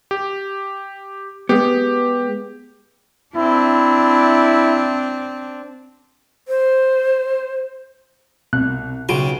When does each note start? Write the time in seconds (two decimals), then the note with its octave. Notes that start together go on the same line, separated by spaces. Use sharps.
0.11 G4
1.49 G#3 B3 G4
3.36 C4 D4 E4
6.48 C5
8.53 C2 B2 F#6
9.09 B1 C#3 F#4 G4 C6 D7